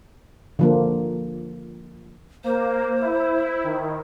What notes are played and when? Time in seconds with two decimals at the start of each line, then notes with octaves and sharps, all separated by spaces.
0.59 D3 F3 A#3
2.44 A#3 C5
3.00 E4
3.64 D#3